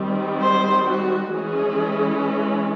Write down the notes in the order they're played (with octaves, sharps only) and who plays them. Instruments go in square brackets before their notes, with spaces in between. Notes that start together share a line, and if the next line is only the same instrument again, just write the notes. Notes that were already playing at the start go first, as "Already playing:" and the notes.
Already playing: [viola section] D#3 G3 C4
C5
F#4
E3 G#3 C#4 G#4